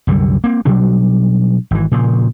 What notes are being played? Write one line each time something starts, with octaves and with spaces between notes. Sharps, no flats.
C2 F#2 D3 G3
A#3 C4
B2 F#3 G3 D4
G#1 E3
A#2 C#3 F3